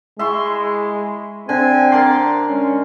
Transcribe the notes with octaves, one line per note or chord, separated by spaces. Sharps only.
G#3 E4 E5 C6 C#6
D3 C4 G#5
A#4 D5 A5 C6
G#3 C#4